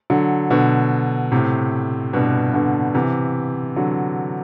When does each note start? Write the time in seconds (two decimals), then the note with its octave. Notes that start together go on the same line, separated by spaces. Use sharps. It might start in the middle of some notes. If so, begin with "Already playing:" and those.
0.10 D3 F#3
0.51 B2 D3
1.32 A2 C3
2.13 G2 B2
2.54 B2 D3
2.95 C3 E3
3.76 D3 F#3